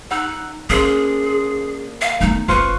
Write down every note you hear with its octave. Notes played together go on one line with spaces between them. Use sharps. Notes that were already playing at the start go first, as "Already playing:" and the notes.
D#4 F#5 E6
A#3 C#4 D4 G#4 C5
F5
A3 B3 D#4
F#1 F4 B4 C5 C#6